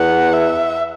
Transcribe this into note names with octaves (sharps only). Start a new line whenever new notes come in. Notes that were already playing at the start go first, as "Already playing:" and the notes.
Already playing: E2 F#5
E5